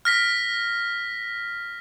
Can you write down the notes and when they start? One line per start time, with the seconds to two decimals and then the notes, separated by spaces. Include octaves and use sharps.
0.05 F6 A#6 B6